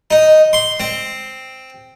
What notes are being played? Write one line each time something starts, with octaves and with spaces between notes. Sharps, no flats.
D#4
C6
C4